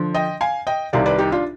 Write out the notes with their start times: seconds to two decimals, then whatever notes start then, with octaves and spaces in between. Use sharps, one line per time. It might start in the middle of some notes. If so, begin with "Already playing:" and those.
Already playing: D3 F3
0.14 D#5 G5
0.41 F5 G#5
0.67 D#5 G5
0.93 C2 C3 D#3 G3 D5 F5
1.06 B4 D5
1.18 D#4 G4
1.32 D4 F4